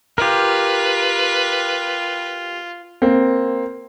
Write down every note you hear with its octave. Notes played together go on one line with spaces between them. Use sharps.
F4 G4 A#4 B4
A#3 C4